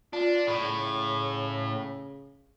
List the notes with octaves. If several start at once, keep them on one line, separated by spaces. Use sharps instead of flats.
D4 F4
A2 C#3